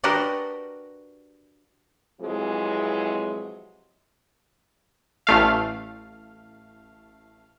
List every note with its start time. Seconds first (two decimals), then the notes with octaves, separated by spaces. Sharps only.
0.04 D4 F#4 G4 A#4 B4 D#5
2.21 F2 C3 E3 F#3 G#3
5.27 A1 A3 F5